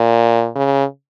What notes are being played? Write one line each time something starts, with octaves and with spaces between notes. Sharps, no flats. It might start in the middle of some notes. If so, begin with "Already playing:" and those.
Already playing: A#2
C#3